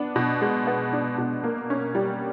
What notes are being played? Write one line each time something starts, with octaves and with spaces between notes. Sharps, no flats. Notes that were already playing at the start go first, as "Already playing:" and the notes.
Already playing: B3 D4
B2
G#3
B3
D4
B2
A#3
C#4
G3